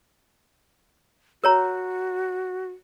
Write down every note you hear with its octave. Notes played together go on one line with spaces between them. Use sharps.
F#4 A#4 C#5 A#5